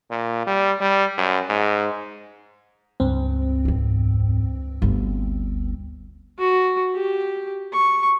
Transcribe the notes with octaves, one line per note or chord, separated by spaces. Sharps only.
A#2
G3
G3
F#2
G#2
C#2 G2 C4
E2 G#2
G1 D2
F#4
G4
C#6